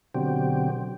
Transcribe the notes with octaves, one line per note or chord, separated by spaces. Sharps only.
B2 D3 F#3 C4 G4